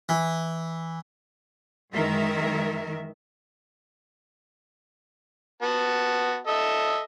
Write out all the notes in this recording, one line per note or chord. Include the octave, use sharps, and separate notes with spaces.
E3
F#2 D#3 E3 G#3 A#4 E5
B3 F#4 A5
A4 D#5 E5